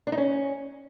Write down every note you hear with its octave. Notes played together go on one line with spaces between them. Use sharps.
D4
D#4
C#4